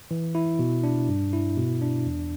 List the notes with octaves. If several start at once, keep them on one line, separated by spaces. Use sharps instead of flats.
E3
E4
B2
D4
G2
E4
B2
D4
E2